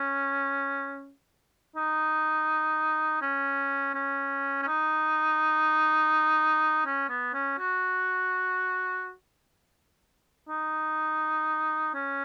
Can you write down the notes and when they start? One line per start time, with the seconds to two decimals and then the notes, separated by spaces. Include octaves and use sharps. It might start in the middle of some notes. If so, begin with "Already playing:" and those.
Already playing: C#4
1.76 D#4
3.22 C#4
3.94 C#4
4.62 C#4
4.67 D#4
6.86 C#4
7.09 B3
7.33 C#4
7.58 F#4
10.49 D#4
11.94 C#4